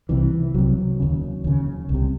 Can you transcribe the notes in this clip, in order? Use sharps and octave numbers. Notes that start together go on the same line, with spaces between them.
C2 C3 E3
C2 C3 F#3
D#2 C#3
D#2 C#3
C2
C3